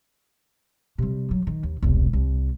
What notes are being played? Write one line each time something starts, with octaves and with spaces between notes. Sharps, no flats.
C3 G3
F#3
D#3
D#2
E1 C2
C2